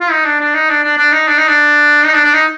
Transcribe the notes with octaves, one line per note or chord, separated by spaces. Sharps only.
F4
D#4
D4
D4
D#4
D4
D4
D4
D#4
D4
D#4
D4
D#4
D4
D4
D#4